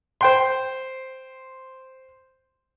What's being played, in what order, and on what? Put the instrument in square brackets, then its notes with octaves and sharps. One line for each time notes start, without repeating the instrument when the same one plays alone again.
[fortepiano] C5 G5 C6